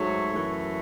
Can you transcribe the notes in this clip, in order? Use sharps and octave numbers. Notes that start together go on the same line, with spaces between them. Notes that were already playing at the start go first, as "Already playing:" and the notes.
Already playing: G#2 F#3 A3 C#5
F#2 E3 A3